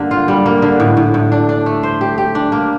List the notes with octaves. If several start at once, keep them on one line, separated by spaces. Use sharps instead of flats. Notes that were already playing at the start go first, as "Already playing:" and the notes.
Already playing: G2 D3 A#3
F4
G3
A#3
D3
A2
A2
A2
D4
D4
A3
C5
G4
G4
D4
A#3